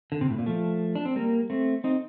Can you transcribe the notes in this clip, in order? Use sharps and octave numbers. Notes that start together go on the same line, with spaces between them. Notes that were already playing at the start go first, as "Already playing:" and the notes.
D3
C3
A2
A#2
F3 A3
D4
C4
G3 A#3
A3 C4
C4 D#4